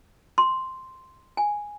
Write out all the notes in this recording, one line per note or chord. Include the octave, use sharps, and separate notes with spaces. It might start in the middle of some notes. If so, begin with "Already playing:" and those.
C6
G#5